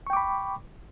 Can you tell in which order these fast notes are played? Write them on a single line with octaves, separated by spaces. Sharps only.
C#6 G5 D6 B5